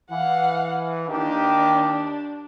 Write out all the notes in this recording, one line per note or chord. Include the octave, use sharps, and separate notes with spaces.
E3 F5 F#5
D#2 D#3 D4 G4